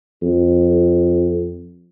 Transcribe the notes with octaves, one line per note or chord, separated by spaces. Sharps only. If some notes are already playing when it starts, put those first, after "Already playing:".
F2